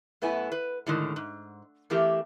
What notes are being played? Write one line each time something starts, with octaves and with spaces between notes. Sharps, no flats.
F#2 A3 B3 E4 G#5
B4
A2 D3 D#3 G#3
G#2
E3 A3 C4 G4 A#4